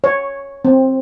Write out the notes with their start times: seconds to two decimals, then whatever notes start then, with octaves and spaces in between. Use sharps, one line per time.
0.04 C#5
0.65 C4